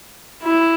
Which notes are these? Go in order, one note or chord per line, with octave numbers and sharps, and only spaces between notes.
E4